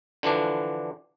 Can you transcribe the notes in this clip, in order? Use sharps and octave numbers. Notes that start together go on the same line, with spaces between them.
D3 E3 F3 D4